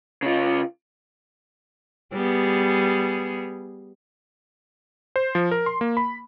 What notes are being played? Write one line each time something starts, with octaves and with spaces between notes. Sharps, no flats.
C#3 F4
G3 B3 G#4
C5
F3
A#4
C6
A#3
B5